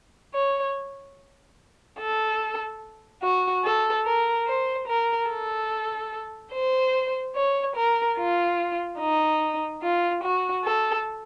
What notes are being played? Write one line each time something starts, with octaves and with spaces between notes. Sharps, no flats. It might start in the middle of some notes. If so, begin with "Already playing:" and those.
C#5
A4
F#4
A4
A#4
C5
A#4
A4
C5
C#5
A#4
F4
D#4
F4
F#4
A4